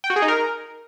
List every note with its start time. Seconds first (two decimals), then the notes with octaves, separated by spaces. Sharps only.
0.04 G5
0.10 F#4
0.16 G#4
0.22 D#4
0.28 A#4